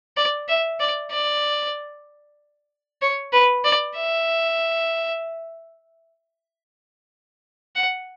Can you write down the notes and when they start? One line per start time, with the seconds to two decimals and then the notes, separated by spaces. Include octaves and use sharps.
0.17 D5
0.48 E5
0.80 D5
1.11 D5
3.01 C#5
3.32 B4
3.64 D5
3.96 E5
7.75 F#5